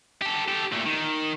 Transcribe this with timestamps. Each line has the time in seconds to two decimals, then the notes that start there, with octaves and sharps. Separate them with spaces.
0.22 G4 A4
0.48 G4 A4
0.72 A#2 A3
0.86 D#3